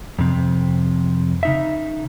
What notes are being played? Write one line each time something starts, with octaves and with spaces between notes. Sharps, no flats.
F2 C3
C#3 D#4 E5